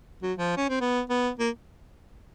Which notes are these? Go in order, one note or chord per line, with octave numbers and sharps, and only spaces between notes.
F#3
F3
C#4
C4
B3
B3
A#3